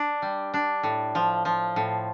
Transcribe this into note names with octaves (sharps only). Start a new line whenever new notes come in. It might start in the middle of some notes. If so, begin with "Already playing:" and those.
Already playing: D4
G3
D4
A2
F3
F3
A2